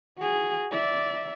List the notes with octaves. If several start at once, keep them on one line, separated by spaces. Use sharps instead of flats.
F#4 G#4
D5 E5